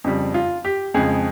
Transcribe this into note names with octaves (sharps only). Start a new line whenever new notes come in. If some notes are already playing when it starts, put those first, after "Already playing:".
F2 C#3 G3
F4
G4
F2 C#3 G#3 G#4